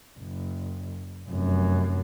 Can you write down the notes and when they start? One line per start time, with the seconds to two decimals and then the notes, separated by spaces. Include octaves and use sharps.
0.19 F#1
1.28 F1 F#2